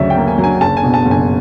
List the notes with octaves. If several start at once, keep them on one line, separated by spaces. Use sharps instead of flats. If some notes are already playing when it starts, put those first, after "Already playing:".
Already playing: D2 C#3 F#3 C#5 D5 E5
G5
A#3
G#5
F#3
G#5
F#1 A5
G#5
B2
A5
F#1
G#5